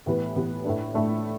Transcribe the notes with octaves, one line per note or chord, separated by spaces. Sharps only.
A2 E3 B3 G4 B4
A2 E3 B3 G4 B4
A2 A3 D4
A2 A3 D4